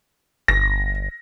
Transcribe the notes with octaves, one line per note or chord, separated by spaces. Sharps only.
G1 A#6